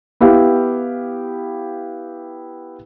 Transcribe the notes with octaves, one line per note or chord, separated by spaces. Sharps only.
B3 E4 G4 F5